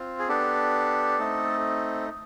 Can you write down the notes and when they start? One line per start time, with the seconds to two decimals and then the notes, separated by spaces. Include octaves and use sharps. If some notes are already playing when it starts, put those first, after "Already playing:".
Already playing: C4 F4
0.19 G#4
0.28 B3 D4 G4 A4
1.19 A3 C4 D#4